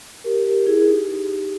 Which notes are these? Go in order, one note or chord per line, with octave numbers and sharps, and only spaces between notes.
G4 A#4
G4 A#4
E4 G#4
D#4 G4